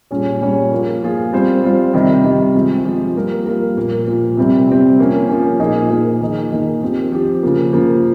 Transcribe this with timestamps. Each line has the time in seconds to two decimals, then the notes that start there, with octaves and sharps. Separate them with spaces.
0.11 A#2 G3 C#4 G#4 C#5
0.41 A#2 G3 C#4 G#4 C#5
0.72 F3 A#3 F4 G#4
1.02 F3 A#3 F4 G#4
1.32 G3 C4 F4 C5
1.63 G3 C4 F4 C5
1.94 C3 D#3 G3
2.24 C3 D#3 G3
2.54 F3 G#3 C4
2.85 F3 G#3 C4
3.15 G3 A#3 F4 A#4
3.46 G3 A#3 F4 A#4
3.77 A#2 F3 A#3
4.07 A#2 F3 A#3
4.37 C3 G3 C4
4.68 C3 G3 C4
4.98 F3 A#3 C#4
5.29 F3 A#3 C#4
5.60 A#2 F3 A#3 D#4 G#4
5.90 A#2 F3 A#3 D#4 G#4
6.21 D#3 A#3 D#4 G#4
6.52 D#3 A#3 D#4 G#4
6.82 F3 C4 G4
7.12 F3 C4 G4
7.43 C#3 F3 A#3
7.73 C#3 F3 A#3